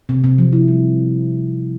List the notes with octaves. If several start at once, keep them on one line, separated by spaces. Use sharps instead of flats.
C3
C3
F3
E4
G3